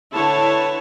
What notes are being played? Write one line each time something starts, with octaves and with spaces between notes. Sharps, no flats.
D3 E4 B4 C#5 A5